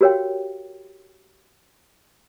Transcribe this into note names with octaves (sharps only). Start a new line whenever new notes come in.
F#4 G4 A#4 C#5 F5 G5